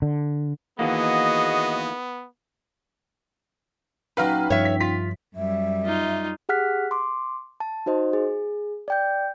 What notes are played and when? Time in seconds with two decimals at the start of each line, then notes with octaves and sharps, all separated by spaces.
0.02 D3
0.79 D#2 E3 A#3 B3 F#4 G#4 D#5
4.17 A#2 F#3 C#4 D#4 B4 F5 G5
4.50 G2 F3 C#5 E5
4.65 B6
4.80 F4 B6
5.36 F#2 G3 E5
5.85 D#4 F4
6.49 G4 G#4 F#5 F6 F#6 B6
6.91 C6 D6
7.60 A5
7.86 D#4 F#4 C5 D#5
8.13 G#4
8.88 D5 G5 G6